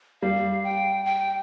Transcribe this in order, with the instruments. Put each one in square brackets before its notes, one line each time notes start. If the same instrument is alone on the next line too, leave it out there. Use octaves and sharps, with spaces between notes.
[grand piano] G3 [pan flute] F5
[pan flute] G5
G5